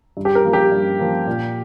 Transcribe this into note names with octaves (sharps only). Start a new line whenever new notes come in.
G2
G4
A#4
F3 A#3
G4
G2
F3 A#3
A#2